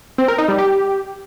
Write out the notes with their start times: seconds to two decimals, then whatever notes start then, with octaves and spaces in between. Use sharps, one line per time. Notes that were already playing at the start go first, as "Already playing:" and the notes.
0.18 C4
0.28 A#4
0.38 D#4
0.48 G3
0.58 G4